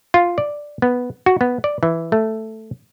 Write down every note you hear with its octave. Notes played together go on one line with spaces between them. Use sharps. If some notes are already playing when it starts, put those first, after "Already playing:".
F4
D5
B3
F#4
B3
D5
E3
A3